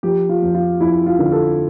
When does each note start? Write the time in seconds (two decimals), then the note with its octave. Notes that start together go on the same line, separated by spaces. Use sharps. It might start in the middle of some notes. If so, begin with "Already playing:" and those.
0.03 F3 G4
0.29 F4
0.42 F2
0.54 F4
0.80 F2 E4
1.06 F4
1.19 D3
1.32 A4